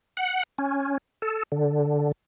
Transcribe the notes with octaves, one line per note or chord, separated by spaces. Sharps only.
F#5
C#4
A4
D3